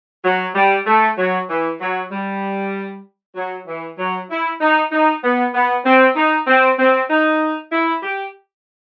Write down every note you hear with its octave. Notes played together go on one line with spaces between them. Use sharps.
F#3
G3
A3
F#3
E3
F#3
G3
F#3
E3
F#3
E4
D#4
D#4
B3
B3
C4
D#4
C4
C4
D#4
E4
G4